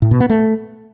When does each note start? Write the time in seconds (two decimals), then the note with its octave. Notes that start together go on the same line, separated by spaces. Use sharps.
0.02 A2
0.11 B2
0.20 B3
0.29 A3